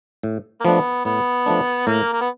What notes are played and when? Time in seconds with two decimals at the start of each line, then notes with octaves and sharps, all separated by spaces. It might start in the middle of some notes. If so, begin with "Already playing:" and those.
0.23 A2
0.60 A#3
0.64 F3 A3 B3 D4
1.05 A2 B3
1.46 F3 A3 D4
1.87 A2 A#3
2.13 A#3
2.21 B3